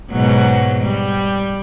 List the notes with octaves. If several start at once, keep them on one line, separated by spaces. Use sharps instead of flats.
G#2 B2 F#3
G3